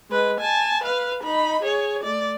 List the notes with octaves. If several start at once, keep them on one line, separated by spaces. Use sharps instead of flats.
G#3 B4
G#5 A5
B4 F5
D#4 B5
G#4 C#5
A3 D5